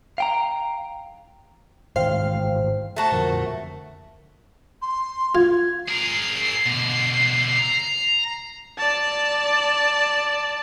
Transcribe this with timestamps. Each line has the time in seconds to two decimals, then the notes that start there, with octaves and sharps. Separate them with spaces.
0.18 F5 G5 A#5
1.96 G#2 D#3 E3 C5 F5 G5
2.96 A3 F#4 A5
3.12 F2 D3 F3 A#4
4.82 C6
5.35 F4 G#6
5.89 G#4 A#4 C7
6.66 B2 D3
7.59 A#5
8.78 D5 A5